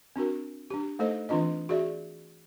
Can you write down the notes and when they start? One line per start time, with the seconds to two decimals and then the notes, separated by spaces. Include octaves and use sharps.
0.16 C4 D4 F#4 A#4
0.70 D4 G4
0.99 A3 D#4 A4 C5 D#5
1.29 E3 C4 D4 F4 D#5
1.69 F#4 G#4 D5 E5